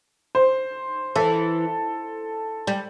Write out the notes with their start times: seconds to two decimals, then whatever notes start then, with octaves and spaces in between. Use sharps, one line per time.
0.35 C5
1.16 E3 A4
2.67 G3